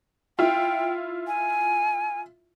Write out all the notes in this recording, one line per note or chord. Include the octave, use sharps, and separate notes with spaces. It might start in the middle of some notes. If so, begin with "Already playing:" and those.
E4 F4 G5
G#5